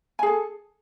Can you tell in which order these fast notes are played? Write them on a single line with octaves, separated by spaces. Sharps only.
G#5 G#4 A4